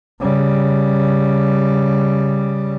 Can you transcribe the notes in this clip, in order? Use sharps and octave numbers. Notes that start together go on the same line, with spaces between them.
C#3 G3